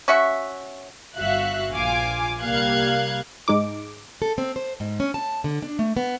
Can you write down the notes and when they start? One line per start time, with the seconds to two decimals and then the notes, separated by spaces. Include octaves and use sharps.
0.08 C#4 F#4 E5 C#6
1.18 G1 F#4 E5 F5 F#6
1.72 A#1 F4 F5 G#5 D6
2.42 C2 G3 A#3 F5 F#6 G#6
3.48 G#2 G#3 D#4 D6
4.22 A4
4.38 C4
4.56 C5
4.80 G#2
5.00 C#4
5.14 A5
5.44 D3
5.62 D4
5.79 A3
5.97 B3